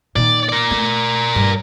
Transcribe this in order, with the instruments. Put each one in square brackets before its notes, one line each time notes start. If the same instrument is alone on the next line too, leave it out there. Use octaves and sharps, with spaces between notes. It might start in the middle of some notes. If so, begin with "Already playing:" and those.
[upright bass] A#2 D#3 [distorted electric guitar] D5
[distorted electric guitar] A#4 D5
[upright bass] A3
G2